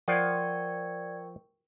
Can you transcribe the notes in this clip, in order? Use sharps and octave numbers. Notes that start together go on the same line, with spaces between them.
F3 F4 A#4 D5 F#5 G5 C#6 G#6